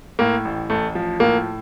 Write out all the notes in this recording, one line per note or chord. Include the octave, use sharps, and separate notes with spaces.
A2 A#3
A1
A1 A3
F3
A2 A#3